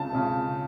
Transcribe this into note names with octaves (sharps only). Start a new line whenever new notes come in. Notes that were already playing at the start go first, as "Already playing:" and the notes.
Already playing: C#2 C#3 A5
C#2 C#3